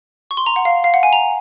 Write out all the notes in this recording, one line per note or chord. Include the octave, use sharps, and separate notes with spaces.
C#6
C6
A#5
F#5
F5
F5
F#5
G#5
A#5